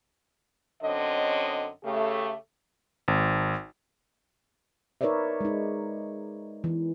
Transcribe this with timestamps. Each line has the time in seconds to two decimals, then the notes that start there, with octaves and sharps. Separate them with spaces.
0.82 F#2 D3 C4 C#5 D#5
1.84 C#3 A3 G4
3.08 G#1
5.01 D#4 A#4 B4 C#5 D5 E5
5.41 G#3 D#4
6.64 E3